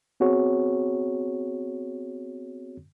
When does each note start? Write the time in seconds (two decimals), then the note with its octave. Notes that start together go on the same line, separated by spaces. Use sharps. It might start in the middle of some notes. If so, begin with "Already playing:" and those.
0.20 B3 C4 F#4 G#4 C#5